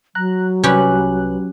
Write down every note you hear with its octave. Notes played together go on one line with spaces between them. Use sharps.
F#3 A#5 F#6
C2 C#4 G4 B4 F#6